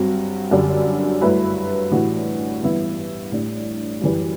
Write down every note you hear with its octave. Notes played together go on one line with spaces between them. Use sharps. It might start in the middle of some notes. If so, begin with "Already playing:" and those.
Already playing: G2 F#3 C4 F#4
F#2 D3 G3 D4
G2 F#3 A3 E4 B4
A2 E3 G3 D4 F#4
G2 E3 B3 E4
A2 G3 D4
F#2 E3 G3